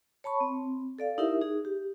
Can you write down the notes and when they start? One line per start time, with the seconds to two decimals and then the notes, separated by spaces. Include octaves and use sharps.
0.24 C#5 A5 B5 C#6
0.41 C4
0.99 A4 D5 F5
1.18 D#4 E4 G4 A#4 E5
1.41 D#4 G#4
1.65 G4